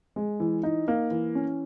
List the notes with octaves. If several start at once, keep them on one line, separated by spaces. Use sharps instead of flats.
G#3
E3
D#4
A#3
E3
C#4